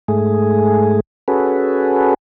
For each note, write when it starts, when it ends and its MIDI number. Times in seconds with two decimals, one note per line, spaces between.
0.08 1.00 44
0.08 1.00 57
0.08 1.00 68
1.28 2.14 61
1.28 2.14 66
1.28 2.14 68
1.28 2.14 69
1.28 2.14 71